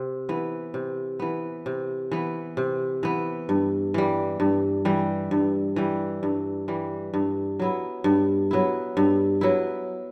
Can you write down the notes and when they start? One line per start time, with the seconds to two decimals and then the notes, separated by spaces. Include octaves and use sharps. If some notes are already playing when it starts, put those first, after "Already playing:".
Already playing: C3
0.29 E3 B3
0.74 C3
1.20 E3 B3
1.66 C3
2.11 E3 B3
2.57 C3
3.03 E3 B3
3.49 G2
3.94 E3 G3
4.40 G2
4.85 E3 G3
5.31 G2
5.76 E3 G3
6.23 G2
6.68 E3 G3
7.14 G2
7.59 F#3 B3 E4
8.04 G2
8.51 F#3 B3 E4
8.97 G2
9.41 F#3 B3 E4